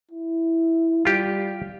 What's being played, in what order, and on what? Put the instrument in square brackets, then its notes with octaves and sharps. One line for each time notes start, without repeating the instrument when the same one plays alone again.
[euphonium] E4
[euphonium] G3 [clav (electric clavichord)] F4 G4